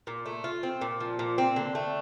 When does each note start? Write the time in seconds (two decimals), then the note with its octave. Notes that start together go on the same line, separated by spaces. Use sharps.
0.07 A#2
0.26 A3
0.44 F4
0.63 C4
0.81 A#2
1.00 F3
1.19 A#2
1.38 C4
1.56 D3
1.75 A3